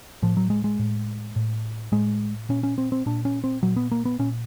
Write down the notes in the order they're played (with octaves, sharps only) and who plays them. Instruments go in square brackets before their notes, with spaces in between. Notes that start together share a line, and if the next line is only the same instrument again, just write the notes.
[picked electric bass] A2 F3
F#3
G#3
G#3
A2
A2
A2 G#3
A#2 C#4
C#4
C4
C4
A#2 D4
C#4
C4
A#2 F#3
B3
A#3
B3
A#2 C#4